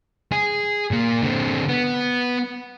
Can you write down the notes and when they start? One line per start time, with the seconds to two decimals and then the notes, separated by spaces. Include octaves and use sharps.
0.32 G#4
0.91 A#2 A#3
1.23 D3 C4
1.69 B3